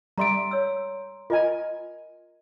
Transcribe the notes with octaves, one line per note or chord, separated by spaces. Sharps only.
G3 D5 E5 A#5 C6 D7
C#5 E6
F4 A#4 D#5 G#5